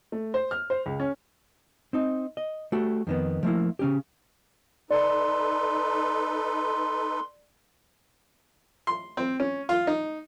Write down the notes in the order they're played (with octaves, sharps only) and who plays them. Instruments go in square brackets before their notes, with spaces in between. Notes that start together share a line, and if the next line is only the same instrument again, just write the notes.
[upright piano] A3
C5
F6
C5
C#2
C#4
[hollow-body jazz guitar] C4 D#4
D#5
A3 F#4 G4
F2 D#3 B3
F3 A3 A#3 E4
C#3 C#4 G4
[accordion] D#4 A4 B4 [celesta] D5 [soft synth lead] C6
[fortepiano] C6
C4
C#4
F4
D#4